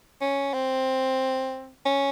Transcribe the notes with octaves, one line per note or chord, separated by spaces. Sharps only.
C#4
C4
C#4